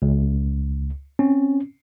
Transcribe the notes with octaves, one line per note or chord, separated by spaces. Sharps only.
C#2
C4 C#4